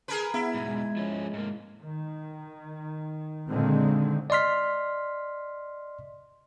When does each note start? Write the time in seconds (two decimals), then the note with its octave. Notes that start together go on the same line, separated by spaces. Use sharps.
0.08 G#4 A#4 B4
0.34 B3 E4
0.54 G#2 B2
0.68 G#3
0.97 F3 C#4
1.34 G#2 A#3
1.81 D#3
3.48 A#2 D3 D#3 G#3 C4
4.30 D5 D#5 C6 F6 B6